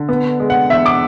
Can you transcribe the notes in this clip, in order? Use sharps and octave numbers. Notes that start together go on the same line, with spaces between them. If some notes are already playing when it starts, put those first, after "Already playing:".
Already playing: D3
B3
G#3
F#5
E2 E5
D6